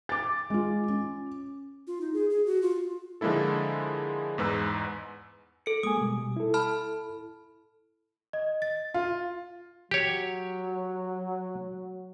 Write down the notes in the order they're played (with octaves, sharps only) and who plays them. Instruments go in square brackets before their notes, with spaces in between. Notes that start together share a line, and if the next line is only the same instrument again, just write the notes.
[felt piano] D6 A6
G#3 F4
C#4
[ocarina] F4
D#4
G#4
G#4
F#4
F4
[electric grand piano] D3 F3 G#3 A#3 E4 A4
E2 G#2 B4 E6
[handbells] A4 C#7
[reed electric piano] G#3 A#3 G#5 [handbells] D#6
[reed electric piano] B2 G3
E4 A4
[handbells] A5 B5 F6
[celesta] D#5
A6
[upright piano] F4
[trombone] F#3 [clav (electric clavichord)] G4 C#5